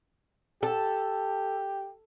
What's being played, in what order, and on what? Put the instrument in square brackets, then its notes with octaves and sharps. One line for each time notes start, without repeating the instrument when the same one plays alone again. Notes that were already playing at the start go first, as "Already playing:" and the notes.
[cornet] G4 [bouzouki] A4